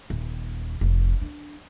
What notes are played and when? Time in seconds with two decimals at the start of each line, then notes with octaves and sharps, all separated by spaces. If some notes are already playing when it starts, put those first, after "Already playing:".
0.10 D#1
0.81 F1
1.21 D4